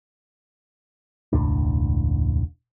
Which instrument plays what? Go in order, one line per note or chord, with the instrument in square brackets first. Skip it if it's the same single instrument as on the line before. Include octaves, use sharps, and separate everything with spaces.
[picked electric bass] E1 C#2 A2 D4